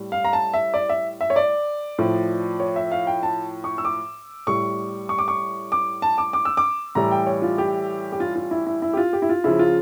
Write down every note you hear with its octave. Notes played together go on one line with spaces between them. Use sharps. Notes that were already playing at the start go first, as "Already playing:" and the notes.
Already playing: A2 G3
F5
A#5
A5
E5
D5
E5
E5
C#5
D5
A2 F3
C#5
E5
F5
G5
A5
C#6
E6
D6
A2 G3 C#6
C#6
D6
C#6
D6
A5
D6
D6
E6
D6
A2 E3 G3 A#5
G5
C#5
F4
G4
G4
F4
F4
E4
E4
E4
G4
F4
G4
E4
F4
C#3 F3 E4
F4